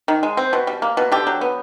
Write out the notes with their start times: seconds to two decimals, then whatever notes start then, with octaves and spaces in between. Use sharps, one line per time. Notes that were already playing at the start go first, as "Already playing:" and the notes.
0.08 D#3
0.23 G#3
0.37 C4
0.53 B2
0.67 G3
0.82 A#3
0.97 B2
1.12 D3 G4
1.27 F#3
1.41 B3